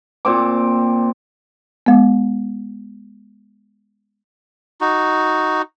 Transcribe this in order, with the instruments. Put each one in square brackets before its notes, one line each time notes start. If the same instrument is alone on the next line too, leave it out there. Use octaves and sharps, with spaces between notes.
[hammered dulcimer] A#2 C4 D6
[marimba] G#3 B3
[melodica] D#4 F#4